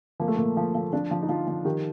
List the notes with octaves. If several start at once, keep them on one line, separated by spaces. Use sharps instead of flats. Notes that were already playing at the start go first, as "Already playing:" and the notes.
F3 A#3
A3
A#2 A#3
F3
F3
F3 D4
F3
D#4
F3 F4
F3
D#3 G4